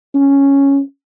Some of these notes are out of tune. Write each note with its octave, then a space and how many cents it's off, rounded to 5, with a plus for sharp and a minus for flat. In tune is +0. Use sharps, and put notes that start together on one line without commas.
C#4 +0